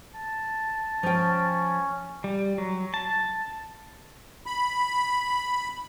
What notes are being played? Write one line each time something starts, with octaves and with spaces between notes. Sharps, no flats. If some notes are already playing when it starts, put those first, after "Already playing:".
A5
F3 C#4 G5
G3
F#3
A5
B5